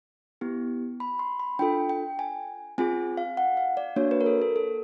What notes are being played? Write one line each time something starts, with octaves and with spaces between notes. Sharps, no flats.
B3 E4 G4
B5
C6
B5
D4 F4 A4 G5
G5
G#5
C4 F4 G#4 G#5
F5
F#5
F5
D5
A#3 D4 F#4 C#5
B4
A#4
A4
A4
A4